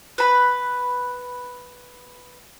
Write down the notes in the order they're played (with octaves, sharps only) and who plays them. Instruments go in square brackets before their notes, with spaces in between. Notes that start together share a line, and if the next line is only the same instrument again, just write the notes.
[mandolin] B4 B5